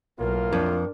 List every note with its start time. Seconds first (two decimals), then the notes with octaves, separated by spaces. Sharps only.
0.19 B1 A2 A#3 F4 A#4
0.53 F2 D4